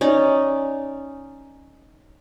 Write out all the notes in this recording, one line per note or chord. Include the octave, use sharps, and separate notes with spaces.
C#4 D#4 D5